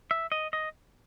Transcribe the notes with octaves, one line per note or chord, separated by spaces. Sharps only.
E5
D#5
D#5